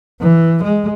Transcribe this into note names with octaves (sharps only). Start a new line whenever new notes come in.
E3
G#3